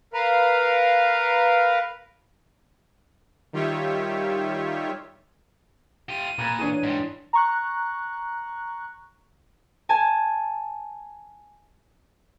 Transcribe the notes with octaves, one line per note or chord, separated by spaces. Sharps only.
A#4 B4 F5
D#3 G3 F4 G4 C#5 E5
F4 G4 D#7
A#2 A#3 B5 F#6 G#6
E3 D4 G#4 A4 C#5
G#2 G3 C6
A#5 C#6 F#6
G#5 A5 G#6